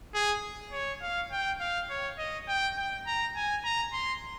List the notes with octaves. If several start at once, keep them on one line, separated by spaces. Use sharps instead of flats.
G#4
C#5
F5
G5
F5
C#5
D#5
G5
G5
A#5
G#5
A#5
C6